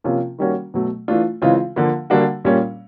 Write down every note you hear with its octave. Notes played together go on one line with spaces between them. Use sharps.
C3 F3 A#3 C#4 F4
D#3 G3 A#3 C#4 F#4
B2 F#3 A3
E3 A3 D4 F4
C#3 E3 G#3 C4 F4
D3 F3 A#3
D3 G3 A#3 D4 F#4
A#2 G3 A#3 C#4